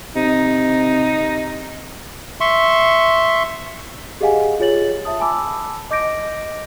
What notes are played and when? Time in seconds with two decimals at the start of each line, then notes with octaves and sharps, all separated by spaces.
0.16 C3 D#4
2.40 E5 C6 C#6
4.21 G4 G#4 D#5 F5 F#5 G#5
4.60 F4 G#4 C#5 A6 F#7
5.05 E5 A5 D#6
5.20 G#5 A5 B5 D6 E6
5.91 D#5 D6 G6 A#6 D7